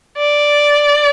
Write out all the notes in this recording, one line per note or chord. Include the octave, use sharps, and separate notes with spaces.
D5